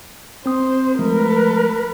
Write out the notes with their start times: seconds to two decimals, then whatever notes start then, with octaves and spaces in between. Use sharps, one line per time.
0.46 C4 C5 D#6
0.99 F3 G#3 A3 A#4 B4